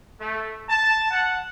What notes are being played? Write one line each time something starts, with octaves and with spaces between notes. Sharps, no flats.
A3
A5
F#5